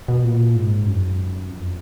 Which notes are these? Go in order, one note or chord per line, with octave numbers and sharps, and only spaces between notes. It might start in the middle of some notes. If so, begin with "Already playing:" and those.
B2
A#2
G#2
F#2
F2